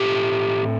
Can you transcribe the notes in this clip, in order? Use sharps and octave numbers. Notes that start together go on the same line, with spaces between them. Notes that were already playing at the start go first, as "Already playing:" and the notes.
Already playing: A2 A3 C4 G4